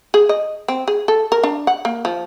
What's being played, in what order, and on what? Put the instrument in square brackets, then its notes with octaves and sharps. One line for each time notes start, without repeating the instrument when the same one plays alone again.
[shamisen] G#4
D#5
C4
G#4
A4
A#4
D4
F#5
A#3
F3